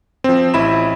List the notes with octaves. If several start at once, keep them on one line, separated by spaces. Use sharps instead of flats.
F3 C4
A1 E4 B5 E7